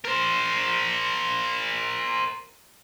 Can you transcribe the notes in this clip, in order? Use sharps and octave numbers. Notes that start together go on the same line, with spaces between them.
A#4 C5